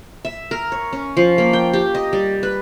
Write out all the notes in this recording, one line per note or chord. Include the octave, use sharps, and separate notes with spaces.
E5
A#4
C#5
C#4
F3
A#3
G5
G4
D#5
G3
B4